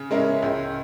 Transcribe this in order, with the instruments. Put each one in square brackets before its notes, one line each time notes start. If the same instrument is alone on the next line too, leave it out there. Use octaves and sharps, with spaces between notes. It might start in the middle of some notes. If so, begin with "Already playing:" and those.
Already playing: [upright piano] C#3
G#3 C#4 E4 A#4
C#2